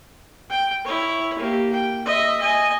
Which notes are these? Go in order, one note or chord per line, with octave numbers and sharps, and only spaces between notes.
G5
E4 C#5
A#3 G4
G5
D#5 E5
D#5 G#5